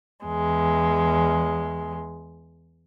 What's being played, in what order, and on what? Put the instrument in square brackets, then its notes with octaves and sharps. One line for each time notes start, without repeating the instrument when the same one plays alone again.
[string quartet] E2 G#3